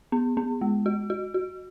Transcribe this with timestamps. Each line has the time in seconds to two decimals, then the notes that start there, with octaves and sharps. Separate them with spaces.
0.12 B3
0.37 B3
0.61 G#3
0.86 F#4
1.10 F#4
1.34 F#4